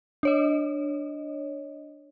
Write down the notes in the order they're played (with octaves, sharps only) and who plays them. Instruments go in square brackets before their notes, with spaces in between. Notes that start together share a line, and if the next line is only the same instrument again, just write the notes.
[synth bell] D4 C#5 D#5